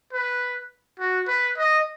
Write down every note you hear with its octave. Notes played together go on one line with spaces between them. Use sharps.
B4
F#4
B4
D#5